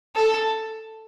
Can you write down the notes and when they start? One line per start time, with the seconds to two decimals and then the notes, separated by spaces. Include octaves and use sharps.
0.16 A4